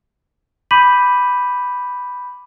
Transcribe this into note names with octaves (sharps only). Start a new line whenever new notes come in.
B5 D6 G6 B6 D#7 F#7